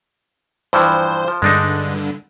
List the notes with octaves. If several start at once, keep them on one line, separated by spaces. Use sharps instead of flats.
G2 E3 F3 C5
F3
G2 D3 G#3 D4 D#4